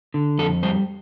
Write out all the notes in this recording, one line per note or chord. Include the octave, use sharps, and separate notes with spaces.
D3
F2 A4
G3 C5